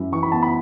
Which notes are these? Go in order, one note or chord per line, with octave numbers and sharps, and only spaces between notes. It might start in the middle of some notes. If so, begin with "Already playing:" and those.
Already playing: F#2 E4
E3 C#6
B5
B3 A5
B5